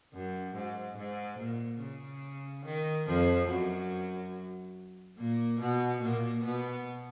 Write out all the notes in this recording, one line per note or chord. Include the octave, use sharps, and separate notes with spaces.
F#2
G#2
G#2
A#2
C#3
D#3
F2 F3
F#2 F#3
A#2 A#3
B2 B3
A#2 A#3
B2 B3